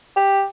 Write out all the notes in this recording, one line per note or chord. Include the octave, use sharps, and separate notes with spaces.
G4